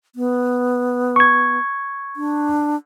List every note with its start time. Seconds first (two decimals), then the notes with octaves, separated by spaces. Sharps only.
0.15 B3
1.16 C#6 G#6
2.16 D4